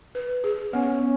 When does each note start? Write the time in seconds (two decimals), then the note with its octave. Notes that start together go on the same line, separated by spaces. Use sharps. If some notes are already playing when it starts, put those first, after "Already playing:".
0.15 B4
0.44 G#4
0.73 B3 C#4